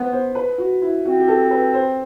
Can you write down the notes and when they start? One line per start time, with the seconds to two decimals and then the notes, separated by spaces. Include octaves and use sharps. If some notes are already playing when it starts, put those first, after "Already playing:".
Already playing: B3 B4 C5
0.13 C5
0.35 B4
0.58 F#4
0.82 E4
1.05 C4 F#4
1.20 G4
1.28 A4
1.51 B4
1.74 C5